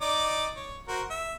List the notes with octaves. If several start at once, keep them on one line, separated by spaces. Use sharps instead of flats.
D#4 D5 D6
C#5
F#4 A#4 C5
E5